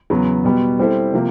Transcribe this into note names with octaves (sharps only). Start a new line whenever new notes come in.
E2 C#3 F#3 B3
B2 G3 B3
G3 C4 E4 A4 C5
C3 F3 A#3